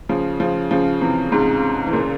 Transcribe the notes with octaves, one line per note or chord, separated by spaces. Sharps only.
C#3 F3
C#3 F3
C#3 F3
C3 E3
G#2 C3
E3
A#2 C#3